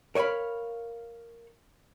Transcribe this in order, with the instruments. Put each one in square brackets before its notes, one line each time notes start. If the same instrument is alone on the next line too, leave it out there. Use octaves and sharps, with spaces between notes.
[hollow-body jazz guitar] A#4 C#5 D#5 F5 B5